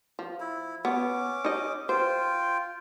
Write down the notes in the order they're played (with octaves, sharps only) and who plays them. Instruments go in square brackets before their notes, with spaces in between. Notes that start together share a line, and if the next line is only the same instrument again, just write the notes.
[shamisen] F3
[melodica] E4
[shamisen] B3 [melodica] C#4 D6
[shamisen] D#4 D#5
[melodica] F4 G5 [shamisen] C5